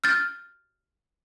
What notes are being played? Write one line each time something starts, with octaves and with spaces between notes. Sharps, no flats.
F6 G6 A6